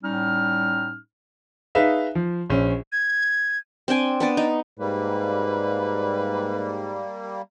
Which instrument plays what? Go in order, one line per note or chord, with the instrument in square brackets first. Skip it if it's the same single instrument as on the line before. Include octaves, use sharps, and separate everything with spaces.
[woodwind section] A2 G3 C#4 D#4 F6
[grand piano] D#4 G#4 B4 E5 F5
F3
A#1 C#4
[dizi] G#6
[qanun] C4 D4 G5 G#5
B3 D4 D5
D#4
[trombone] G#2 [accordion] G3 A#3 [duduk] B4